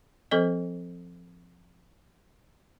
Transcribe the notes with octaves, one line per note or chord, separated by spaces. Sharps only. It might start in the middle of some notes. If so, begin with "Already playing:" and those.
F3 C4 A4 C5 D#5